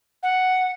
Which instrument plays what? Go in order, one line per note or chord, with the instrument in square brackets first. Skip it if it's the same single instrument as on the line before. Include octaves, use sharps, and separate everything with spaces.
[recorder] F#5